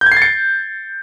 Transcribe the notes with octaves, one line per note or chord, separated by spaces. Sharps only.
G6
G#6
C7
A6
C#7